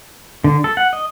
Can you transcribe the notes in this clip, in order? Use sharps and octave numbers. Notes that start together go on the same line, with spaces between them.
D3
A4
F#5
D#5